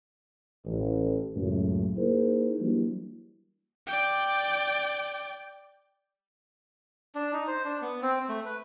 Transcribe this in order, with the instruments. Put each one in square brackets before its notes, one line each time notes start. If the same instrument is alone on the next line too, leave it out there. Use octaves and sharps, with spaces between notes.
[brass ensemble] A1
C#2 F#2 A2
A#3 D#4 E4 G#4 A#4 C5
E3 F#3 G3 A#3 D4 E4
[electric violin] D5 G5
[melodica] D4
D#4
C5
D4
B3
C4
A3
B4